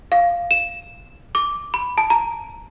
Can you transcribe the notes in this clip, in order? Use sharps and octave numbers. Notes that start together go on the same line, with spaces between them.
F5
E7
D6
B5
A5
A#5